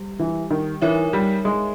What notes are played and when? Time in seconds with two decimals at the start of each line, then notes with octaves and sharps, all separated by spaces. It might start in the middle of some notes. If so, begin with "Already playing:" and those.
Already playing: G3 G4
0.19 E3
0.51 D#3
0.82 E3 D#4 A#4 C#5 E5
1.13 G3
1.45 G#3